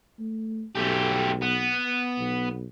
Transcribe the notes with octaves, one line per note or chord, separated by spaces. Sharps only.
A3
B1 A3 G4
B3
B1